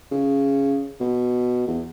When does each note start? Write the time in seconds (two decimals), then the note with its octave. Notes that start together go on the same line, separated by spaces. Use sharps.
0.11 C#3
1.00 B2
1.67 E2